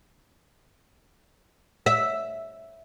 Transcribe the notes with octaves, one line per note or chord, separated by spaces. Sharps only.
E5